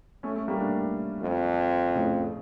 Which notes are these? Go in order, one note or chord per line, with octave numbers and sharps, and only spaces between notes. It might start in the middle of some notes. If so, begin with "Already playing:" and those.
A3 C#4
A3 C#4
G3 A#3
A#3 D4
F2
A2 C#3